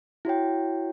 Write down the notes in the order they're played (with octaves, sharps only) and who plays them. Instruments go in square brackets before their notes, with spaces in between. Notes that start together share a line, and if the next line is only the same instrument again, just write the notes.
[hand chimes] E4 F#4 C#5 G5